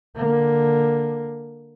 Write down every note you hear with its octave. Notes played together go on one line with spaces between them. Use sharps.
D3 A#3